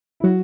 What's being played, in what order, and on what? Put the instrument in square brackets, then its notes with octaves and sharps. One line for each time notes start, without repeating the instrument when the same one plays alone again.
[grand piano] E4
[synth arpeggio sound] F#3 [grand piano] F#4